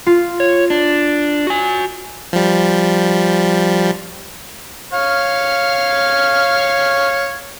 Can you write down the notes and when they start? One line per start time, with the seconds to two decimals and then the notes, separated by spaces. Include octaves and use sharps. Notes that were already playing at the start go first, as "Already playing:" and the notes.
0.06 F4
0.40 C#5
0.70 D4
1.47 F#4 G#5
2.33 F3 G3
4.93 C#5 F5 F6